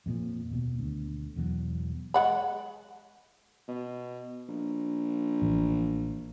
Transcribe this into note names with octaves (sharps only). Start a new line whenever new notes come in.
F2 A#2 F3
D#1 B2
D2
E1 E2 B2 F#3
G#3 F#5 B5
B2
A#1
A1